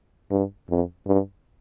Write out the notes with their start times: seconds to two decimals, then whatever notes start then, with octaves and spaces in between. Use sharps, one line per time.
0.31 G2
0.69 F2
1.07 G2